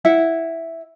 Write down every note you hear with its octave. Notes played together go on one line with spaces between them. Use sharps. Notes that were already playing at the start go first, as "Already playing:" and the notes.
E4 E5 F#5